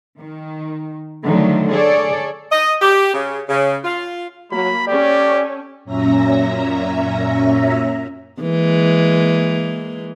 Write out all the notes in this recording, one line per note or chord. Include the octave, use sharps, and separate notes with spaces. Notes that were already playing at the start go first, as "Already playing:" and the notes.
D#3
D3 D#3 F3 F#3 A3
G#4 A4 C#5 D5
D#5
G4
C#3
C#3
F4
F#3 A#3 B5
C#4 G4 A4 D5
F#2 A#2 C#4 E5 A#5 A#6
E3 G#3 A#3